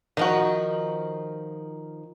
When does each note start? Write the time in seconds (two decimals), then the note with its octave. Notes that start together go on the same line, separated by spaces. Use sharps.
0.17 D#3 F3 D#4 F#4